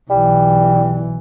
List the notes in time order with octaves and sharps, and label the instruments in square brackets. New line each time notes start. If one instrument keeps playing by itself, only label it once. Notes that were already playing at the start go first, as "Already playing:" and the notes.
[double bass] B1 E3 [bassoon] G3